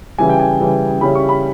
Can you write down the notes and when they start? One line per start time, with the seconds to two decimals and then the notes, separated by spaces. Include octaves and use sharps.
0.18 C#3 E3 G3 G#5
0.29 G5
0.40 G#5
0.60 C#3 E3 G3
1.01 C#3 G3 C#4 E4 B5
1.15 C#6
1.29 B5